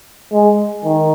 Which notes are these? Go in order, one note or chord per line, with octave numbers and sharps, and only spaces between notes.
G#3
D#3